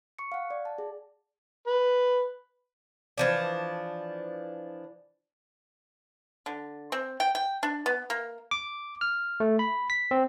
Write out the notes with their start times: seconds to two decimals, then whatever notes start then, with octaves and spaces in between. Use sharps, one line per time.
0.19 C#6 C#7
0.32 F5 F#5
0.50 D5
0.65 A5
0.78 G#4
1.67 B4
3.18 E3 F3 D4
6.46 D3
6.92 C4
7.20 G5
7.35 G5
7.63 D4
7.86 B3
8.10 A#3
8.51 D6
9.01 F6
9.40 A3
9.59 B5
9.90 B6
10.11 C4